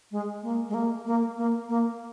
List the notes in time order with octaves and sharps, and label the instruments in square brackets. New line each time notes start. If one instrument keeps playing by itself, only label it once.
[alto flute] G#3
A#3
G#3
A#3
A#3
A#3
A#3